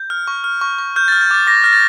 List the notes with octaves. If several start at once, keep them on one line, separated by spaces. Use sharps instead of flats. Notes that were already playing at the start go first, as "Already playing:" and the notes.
Already playing: G6
F6
C#6
F6
C#6
C#6
F6 G6
F6 A6
G6
D6 A6
D6 A#6
F6 A#6
A6